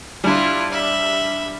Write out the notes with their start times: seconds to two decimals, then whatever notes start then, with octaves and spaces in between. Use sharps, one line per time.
0.24 G3 D4 E4 F4
0.72 E5 B5